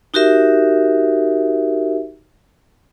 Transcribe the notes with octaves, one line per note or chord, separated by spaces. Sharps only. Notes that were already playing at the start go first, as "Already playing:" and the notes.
D#4 F#4 G4 A#4 E5